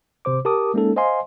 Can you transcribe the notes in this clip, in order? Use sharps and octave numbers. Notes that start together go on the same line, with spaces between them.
G#1 C3 C5 D6
G4 A#4 A5 D6 D#6
G#3 A#3 C#4 D#4 A4
C5 D#5 F5 G#5 C6